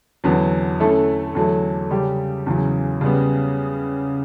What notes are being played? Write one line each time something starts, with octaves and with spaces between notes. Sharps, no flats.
E2 D3 F#3 B3
D3 A3 C#4 E4 A4
E2 D3 F#3 A3
C#3 G3 C#4 G4
E2 C#3 F#3
C#3 G3 B3